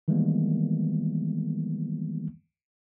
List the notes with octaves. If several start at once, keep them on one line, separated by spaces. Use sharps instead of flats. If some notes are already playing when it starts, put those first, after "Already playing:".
D#3 E3 G3 G#3 A#3 B3